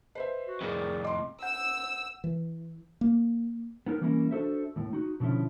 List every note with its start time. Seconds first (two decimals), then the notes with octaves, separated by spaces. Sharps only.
0.15 B4 C5 D#5 E5
0.47 F#4
0.61 F2 A2 G#4 A#4 D5
1.05 D#5 C6 D6
1.43 F#5 E6 G6
2.24 E3
3.01 A#3
3.86 B3 D#4 A#4
4.01 E3 G3 A#3 C#4 E4 A#4
4.31 D4 F#4 A4 C5 E5
4.76 D#2 A2
4.93 D#4 F#4
5.20 B2 D3 F3 C#4 E4